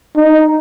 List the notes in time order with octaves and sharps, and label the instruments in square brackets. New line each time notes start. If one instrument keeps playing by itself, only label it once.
[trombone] D#4